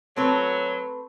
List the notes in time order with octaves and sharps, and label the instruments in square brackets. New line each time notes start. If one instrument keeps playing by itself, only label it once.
[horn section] F#3 [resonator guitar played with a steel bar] A3 C4 B4